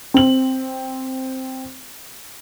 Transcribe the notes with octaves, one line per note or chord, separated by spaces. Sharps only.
C4 F#7